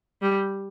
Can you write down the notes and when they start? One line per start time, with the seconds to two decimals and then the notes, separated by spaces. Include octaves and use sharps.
0.22 G3